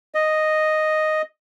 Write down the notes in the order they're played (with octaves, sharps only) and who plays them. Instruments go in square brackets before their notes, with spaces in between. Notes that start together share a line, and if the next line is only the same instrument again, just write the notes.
[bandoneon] D#5